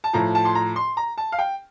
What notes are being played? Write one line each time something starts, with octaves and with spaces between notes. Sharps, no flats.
A5
A2 F3 A#5
A5
C6
A#5
C6
A#5
A5
F5
G5